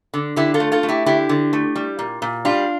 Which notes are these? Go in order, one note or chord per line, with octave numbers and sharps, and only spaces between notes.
D3
D3 E4 G4
F4 A4
A3
F4 A4
A3
E4 G4
D3 E4 G4
D3
A3
G3
A#2
A#2
G3 D4 F4